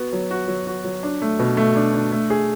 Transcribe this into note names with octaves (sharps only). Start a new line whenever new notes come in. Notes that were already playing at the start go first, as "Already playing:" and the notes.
Already playing: B3 F#4
F#3
F#4
F#3
F#4
F#3
D4
A3
B2
A3
D4
D4
A3
G#4